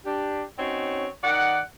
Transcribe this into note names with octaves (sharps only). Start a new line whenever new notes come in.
D4 G4
C4 C#4 D#4 F#4 C#5
D#3 D5 F#5